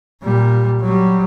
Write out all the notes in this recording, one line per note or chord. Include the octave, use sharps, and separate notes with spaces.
A#2 G3
F#3 G3